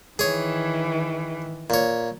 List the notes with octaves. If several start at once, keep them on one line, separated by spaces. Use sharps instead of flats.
D#3 E3 G#4 C#5
A#2 C#5